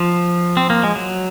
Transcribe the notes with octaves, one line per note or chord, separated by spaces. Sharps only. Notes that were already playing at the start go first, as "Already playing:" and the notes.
Already playing: F3
C4
A#3
G#3
F#3